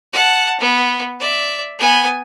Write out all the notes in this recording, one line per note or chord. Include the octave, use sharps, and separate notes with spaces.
F#5 A5
B3
D5 E5
B3 G#5